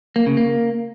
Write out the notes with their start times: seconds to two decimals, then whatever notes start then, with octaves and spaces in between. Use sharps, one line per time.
0.16 A#3
0.26 C#3
0.37 A#3